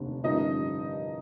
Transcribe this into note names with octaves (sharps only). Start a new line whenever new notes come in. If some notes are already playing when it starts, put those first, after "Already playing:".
Already playing: F1 D#2 D3
A1 G2 D3 F3 A#3 D#4 D#5